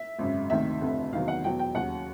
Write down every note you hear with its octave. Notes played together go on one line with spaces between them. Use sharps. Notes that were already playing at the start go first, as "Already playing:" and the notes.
Already playing: E5
G#1 F#2 C#3
D2 C3 D#3 E5
F1 F2 D3
E2 C3 D#3 F#3 F5
F#5
E2 B2 F#3 G5
G5
D#2 C#3 F#3 F#5